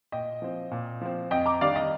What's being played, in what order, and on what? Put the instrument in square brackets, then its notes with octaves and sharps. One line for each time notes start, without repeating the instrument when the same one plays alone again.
[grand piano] A#2 D#5 G5
F3 C4
A#2
F3 C4
F2 D#5 G5
A#5 D6
D#3 G3 D4 D5 F5
D#5